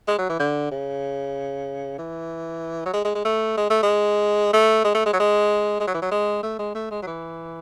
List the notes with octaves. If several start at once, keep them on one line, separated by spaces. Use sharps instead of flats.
G#3
F#3
E3
D3
C#3
E3
F#3
G#3
G#3
G#3
A3
G#3
A3
G#3
A3
G#3
A3
G#3
F#3
G#3
G#3
F#3
E3
F#3
G#3
A3
G#3
A3
G#3
F#3
E3